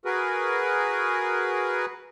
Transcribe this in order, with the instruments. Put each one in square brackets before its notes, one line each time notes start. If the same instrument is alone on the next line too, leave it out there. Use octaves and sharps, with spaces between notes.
[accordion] F#4 G#4 A#4 B4